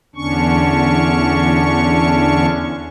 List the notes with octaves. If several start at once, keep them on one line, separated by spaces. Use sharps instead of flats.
E2 D3 C#4 D4 C#6